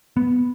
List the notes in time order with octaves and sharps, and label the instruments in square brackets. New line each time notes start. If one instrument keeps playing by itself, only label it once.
[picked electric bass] B3